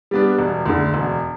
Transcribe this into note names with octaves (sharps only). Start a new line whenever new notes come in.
G3 B3 D4
E1
D2 D3
E1